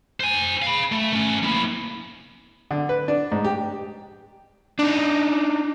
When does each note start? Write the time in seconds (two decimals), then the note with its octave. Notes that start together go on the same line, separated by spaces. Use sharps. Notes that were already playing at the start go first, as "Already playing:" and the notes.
0.20 C5 G#5
0.62 F5 B5
0.92 A3
1.13 A3 C#4
1.43 A#3 E4
2.71 D3
2.89 B4
3.08 D4
3.32 G#2
3.45 G4
4.79 D4 D#4